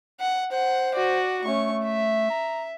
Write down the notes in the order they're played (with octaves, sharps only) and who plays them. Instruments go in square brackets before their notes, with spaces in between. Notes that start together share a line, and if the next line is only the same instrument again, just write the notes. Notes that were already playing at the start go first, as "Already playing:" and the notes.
[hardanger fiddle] F#5
[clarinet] C5 [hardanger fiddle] F#5
[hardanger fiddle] F#4 D5
[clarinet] A3 [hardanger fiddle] C#4 C#6
[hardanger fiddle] E5
[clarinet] A#5